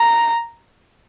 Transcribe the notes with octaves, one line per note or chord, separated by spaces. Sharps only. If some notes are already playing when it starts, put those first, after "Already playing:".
Already playing: A#5